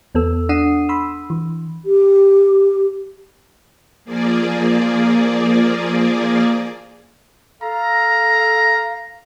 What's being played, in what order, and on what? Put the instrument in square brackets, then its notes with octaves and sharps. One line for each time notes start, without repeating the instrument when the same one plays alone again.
[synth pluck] E2 B3 A4 E6
D4 F#5 D#6 C7 D#7 E7
B5 C6 E6
E3
[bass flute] G4
[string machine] F3 A#3 G#4 D5
[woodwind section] A4 F5 [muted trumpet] A#5